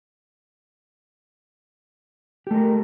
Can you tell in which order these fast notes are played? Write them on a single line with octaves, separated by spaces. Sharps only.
G4 A3 A#4